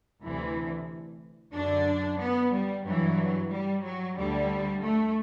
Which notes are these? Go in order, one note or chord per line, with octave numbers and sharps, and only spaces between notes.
D2 C3 E3
F#2 D3 D4
B3
G3
G2 E3 F#3
G3
F#3
D2 D3 G3
A3